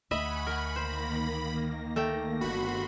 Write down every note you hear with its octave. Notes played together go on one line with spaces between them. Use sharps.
D2 D#5 E5 F#5 G#5 B5 C#6
A#4
D#3 A#3 C5 A#6
A3 A4 G5
G1 F#4 B5 C6